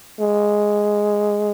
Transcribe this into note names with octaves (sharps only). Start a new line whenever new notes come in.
G#3